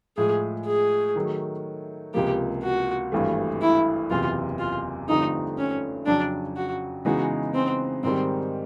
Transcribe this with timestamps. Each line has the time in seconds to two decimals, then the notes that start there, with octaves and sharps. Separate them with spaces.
0.17 A2 F3 G#3 G#4
0.66 G#4
1.16 D#3 F#3 A3
2.14 C#2 C3 F3 A#3 G4
2.63 F#4
3.12 G#1 G2 E3 A3
3.62 E4
4.10 F#1 E2 C3 F4
4.59 F4
5.09 G2 D3 F3 A3 C4 D#4
5.58 C#4
6.06 F2 C#3 F#3 D4
6.57 F#4
7.05 C#3 E3 G#3 B3 D#4 F#4
7.54 C4
8.03 G#2 D#3 G3 C4